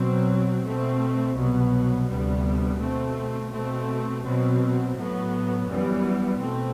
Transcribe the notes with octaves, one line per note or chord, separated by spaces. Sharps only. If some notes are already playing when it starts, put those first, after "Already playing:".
Already playing: B2 F#3 C4
B2 A3 C4
C2 B2 F#3 B3
D2 C3 G3 B3
B2 A3 C4
B2 A3 C4
B2 F#3 C4
A2 F#3 B3
F#2 E3 G3 B3
B2 A3 C4